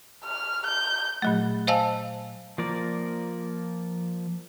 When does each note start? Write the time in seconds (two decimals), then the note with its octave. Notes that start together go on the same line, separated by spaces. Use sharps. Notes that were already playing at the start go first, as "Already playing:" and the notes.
0.25 F6
0.66 G6
1.22 A#2 F#3 A3
1.67 C5 D#5 F5 G#5 A5 E6
2.58 F3 A#3 A#4 D5